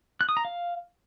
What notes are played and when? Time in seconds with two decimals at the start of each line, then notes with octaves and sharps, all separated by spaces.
0.21 F#6
0.29 D#6
0.37 A#5
0.45 F5